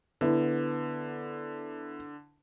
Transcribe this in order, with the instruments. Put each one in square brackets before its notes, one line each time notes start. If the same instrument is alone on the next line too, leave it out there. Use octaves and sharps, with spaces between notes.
[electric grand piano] D3 [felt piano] B3 E4